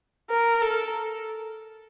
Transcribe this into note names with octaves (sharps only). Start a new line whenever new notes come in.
A#4
A4